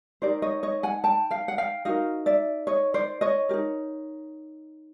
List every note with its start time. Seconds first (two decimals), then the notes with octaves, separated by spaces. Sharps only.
0.22 D#4 G4 A#4 C5 D5
0.42 C#5 D#5
0.63 C#5 D#5
0.83 F#5 G#5
1.04 G5 A5
1.31 F5 G5
1.48 F#5
1.58 F5 G5
1.85 D#4 F#4 A#4 D#5 F5
2.26 D5 E5
2.67 C#5 D#5
2.94 C5 D5
3.21 C#5 D#5
3.49 G4 A#4
3.53 D#4